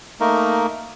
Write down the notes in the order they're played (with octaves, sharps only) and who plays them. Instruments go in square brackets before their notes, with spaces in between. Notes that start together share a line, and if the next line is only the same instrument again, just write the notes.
[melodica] A3 A#3 D#4 A#4